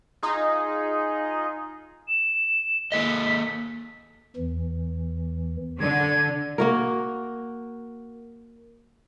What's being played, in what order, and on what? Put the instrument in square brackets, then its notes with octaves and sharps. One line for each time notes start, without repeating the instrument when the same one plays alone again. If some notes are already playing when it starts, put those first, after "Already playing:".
[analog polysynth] D#4 F4 G#4
[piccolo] E7
[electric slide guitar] A#3 A4 D#5 [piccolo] B6
[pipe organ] E2 E3
[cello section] D3 [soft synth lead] G#6
[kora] A#3 F#4 A#4